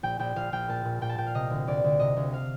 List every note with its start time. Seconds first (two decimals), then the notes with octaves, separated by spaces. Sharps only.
0.03 A#1 G5
0.19 A#1 G5
0.36 A#1 F5
0.52 A#1 G5
0.68 A#2 A5
0.85 A#2
1.01 A#2 G5
1.09 A5
1.18 A#2 G5
1.26 F5
1.35 C3 D#5
1.50 D2
1.67 D2 D5
1.84 D2
2.00 C3 D#5
2.16 D2
2.33 F5